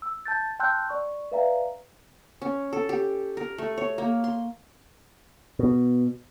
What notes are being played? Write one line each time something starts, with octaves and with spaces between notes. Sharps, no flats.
E6
A5 G6 A6
G5 A5 C6 E6 F#6 G6
D5 C#6
B4 D5 E5 F5 G5 A#5
C#4
A4
G4
A#4
A3
C#5
A#3
C6
B2